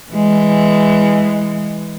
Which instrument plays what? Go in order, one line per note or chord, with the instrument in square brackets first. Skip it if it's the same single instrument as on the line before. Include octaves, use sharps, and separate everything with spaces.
[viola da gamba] E3 G#3